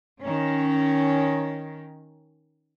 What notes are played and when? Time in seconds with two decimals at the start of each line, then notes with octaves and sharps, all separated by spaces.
0.21 D#3 C#4